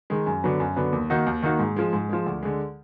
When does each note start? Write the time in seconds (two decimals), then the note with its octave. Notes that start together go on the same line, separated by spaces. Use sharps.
0.10 D#3 G#3
0.26 F#2
0.44 D3 F#3 B3
0.60 F#2
0.76 D3 F#3 B3
0.93 D#2
1.10 D#3 A#3 D#4 F#4
1.26 D#2
1.43 D#3 A#3 D#4 F#4
1.59 G#2
1.76 F3 G#3
1.93 G#2
2.09 F3 G#3
2.26 D2
2.43 D3 G#3